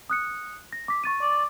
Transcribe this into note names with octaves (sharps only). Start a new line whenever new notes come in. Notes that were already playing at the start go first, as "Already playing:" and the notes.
D#6 F#6 C#7
A#6
D6 B6
C#6 A6 D#7
D5